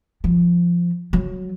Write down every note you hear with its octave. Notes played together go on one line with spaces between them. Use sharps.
F3
F#3